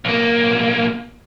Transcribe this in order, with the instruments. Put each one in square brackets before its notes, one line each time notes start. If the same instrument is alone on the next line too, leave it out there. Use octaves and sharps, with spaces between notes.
[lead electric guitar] B1 A#3